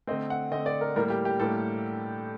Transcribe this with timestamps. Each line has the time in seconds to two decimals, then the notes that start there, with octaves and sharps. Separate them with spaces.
0.07 D3 A3 C4 D#5
0.30 F#5
0.51 D3 A3 C4 D#5
0.66 D5
0.81 A#4
0.96 A2 G3 A#3 A#4
1.10 G4
1.25 G4
1.40 A2 G3 A#3 A4